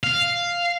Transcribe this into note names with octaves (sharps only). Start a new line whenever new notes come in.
F5